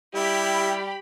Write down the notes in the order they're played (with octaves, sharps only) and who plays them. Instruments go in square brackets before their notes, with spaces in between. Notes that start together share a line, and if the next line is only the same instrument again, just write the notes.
[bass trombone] G3 [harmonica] E4 [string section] G4 B5